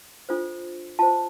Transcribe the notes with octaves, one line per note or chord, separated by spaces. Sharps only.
D4 F4 A4 C5
F4 C5 A5